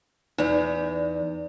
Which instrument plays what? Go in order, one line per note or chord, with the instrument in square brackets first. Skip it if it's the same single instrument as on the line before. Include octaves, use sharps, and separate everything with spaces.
[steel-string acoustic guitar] E2 [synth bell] D#4 D5